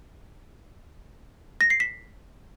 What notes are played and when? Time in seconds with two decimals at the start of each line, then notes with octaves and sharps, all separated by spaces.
1.61 A#6
1.70 C7
1.80 B6